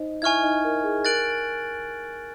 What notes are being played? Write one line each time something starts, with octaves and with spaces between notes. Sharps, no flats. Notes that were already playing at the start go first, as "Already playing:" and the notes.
Already playing: D#4 C5 D#5
E4 E5 G#5 C#6 F6 G#6
D#4 D#5
A#4
G#4
A#4 F#6 A6 D7 F#7